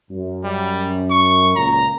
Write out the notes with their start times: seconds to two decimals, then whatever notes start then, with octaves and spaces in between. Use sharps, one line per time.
0.11 F#2
0.44 G3
1.10 C#6
1.56 C#2 A#2 A#5